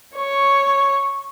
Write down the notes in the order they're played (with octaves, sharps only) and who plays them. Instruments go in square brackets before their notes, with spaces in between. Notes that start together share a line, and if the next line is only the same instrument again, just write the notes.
[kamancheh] C#5 [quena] C#6